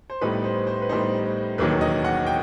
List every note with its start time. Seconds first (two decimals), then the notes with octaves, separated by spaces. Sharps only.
0.10 C5
0.21 A2 G3 B3 D#4 B4
0.44 C5
0.67 C5
0.82 B4
0.89 A2 G3 B3 D#4 C5
1.58 E1 D#2 D#3 F#3 B4
1.81 D#5
2.04 F#5
2.27 G5